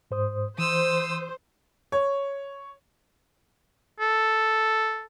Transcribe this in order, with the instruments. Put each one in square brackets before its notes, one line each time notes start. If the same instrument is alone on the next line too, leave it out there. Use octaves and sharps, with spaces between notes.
[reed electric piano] G#2 C5 D#6
[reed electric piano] E3 [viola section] C5 [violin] D#6 E6
[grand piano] C#5
[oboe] A4